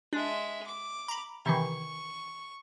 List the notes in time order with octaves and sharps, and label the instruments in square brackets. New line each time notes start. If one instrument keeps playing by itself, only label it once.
[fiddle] G#3 E5 [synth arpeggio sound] D4
[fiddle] D6
[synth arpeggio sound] A#5 B5
[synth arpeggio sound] C3 D#3 E3 [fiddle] C#6